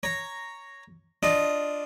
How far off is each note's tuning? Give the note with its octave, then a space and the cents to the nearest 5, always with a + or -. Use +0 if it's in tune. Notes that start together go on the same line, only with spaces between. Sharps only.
C#5 +0 A#5 +0
D4 +0 F4 +0 D#5 +0